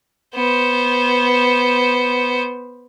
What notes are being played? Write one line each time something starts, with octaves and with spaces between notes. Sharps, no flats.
B3 C5